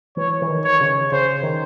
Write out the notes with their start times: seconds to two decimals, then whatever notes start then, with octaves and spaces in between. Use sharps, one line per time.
0.17 E3 C#5
0.42 E3
0.48 D#3
0.64 C#5
0.81 C#3
1.12 C#3 C5
1.43 D#3